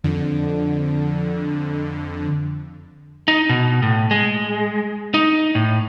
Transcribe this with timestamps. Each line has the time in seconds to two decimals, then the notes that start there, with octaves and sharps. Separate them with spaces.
0.04 F2 D3
3.28 D#4
3.49 B2
3.82 A2
4.11 G#3
5.14 D#4
5.55 A2